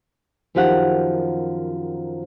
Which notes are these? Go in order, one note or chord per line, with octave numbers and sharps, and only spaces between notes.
F#2 D#3 F3 G4 F5 F#5